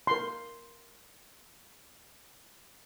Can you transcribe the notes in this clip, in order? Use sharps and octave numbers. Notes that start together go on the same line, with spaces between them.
A#4 C6